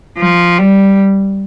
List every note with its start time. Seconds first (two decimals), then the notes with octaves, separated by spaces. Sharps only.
0.18 F3
0.58 G3